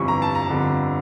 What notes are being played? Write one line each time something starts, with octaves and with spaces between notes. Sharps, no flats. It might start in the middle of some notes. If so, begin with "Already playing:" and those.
Already playing: G1 F2 E3 G3 C#6
A#5
A5
A#5
G1 F2 D3 G3